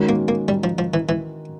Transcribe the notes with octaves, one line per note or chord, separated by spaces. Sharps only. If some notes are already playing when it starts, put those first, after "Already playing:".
Already playing: D#3 G#3 C#4 F#4 A#4
A#3
A#3
G3
F3
F3
E3
E3